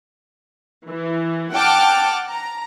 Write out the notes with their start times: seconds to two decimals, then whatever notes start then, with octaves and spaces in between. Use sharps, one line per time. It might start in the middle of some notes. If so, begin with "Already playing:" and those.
0.91 E3
1.54 F#5 G5 A5 D6 F6
2.28 A#5